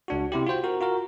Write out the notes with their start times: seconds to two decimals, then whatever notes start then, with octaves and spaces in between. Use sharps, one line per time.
0.08 C#2 D4 F#4
0.32 C3 E4 G4
0.47 F4 F#4 C5 G5
0.64 F#4 A#4
0.80 F4 F#4 A#4